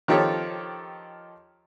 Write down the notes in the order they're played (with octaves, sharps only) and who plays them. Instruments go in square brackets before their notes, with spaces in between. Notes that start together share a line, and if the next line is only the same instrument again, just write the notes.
[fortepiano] D#3 F3 G4 A4 C#5